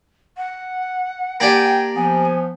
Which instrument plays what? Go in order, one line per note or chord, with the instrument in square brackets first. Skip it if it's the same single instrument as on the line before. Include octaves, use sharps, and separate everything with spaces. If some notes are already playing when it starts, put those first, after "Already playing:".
[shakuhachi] F#5
[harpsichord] A#3 D4 G4 [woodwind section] G5 G#5
[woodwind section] F3 B3 [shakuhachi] G#5